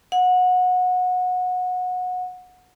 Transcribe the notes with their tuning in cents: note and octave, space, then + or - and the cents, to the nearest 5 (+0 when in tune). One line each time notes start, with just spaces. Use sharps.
F#5 -25